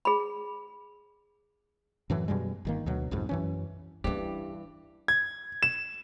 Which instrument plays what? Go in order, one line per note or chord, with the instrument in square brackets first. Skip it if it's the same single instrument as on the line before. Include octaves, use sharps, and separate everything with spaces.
[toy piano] G#4 B5
[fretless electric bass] F#2 A2 E3 F#3
F#2 B2 G3 G#3
G1 D#3 A#3
D2 B2 F#3
B1 F2 G#2
F#2 E3 C#4
[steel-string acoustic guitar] G2 E3 [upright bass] C#4 D4 [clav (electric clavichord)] G4
[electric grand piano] G#6
E7